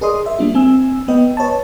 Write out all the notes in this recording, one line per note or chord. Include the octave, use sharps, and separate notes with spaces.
G#4 A#4 D5 D#5 C6 D#6
E5
G3 A#3 D4 F4
C4 G#5 E6
B3 B4 D#5 G5
B4 C#5 D#5 A5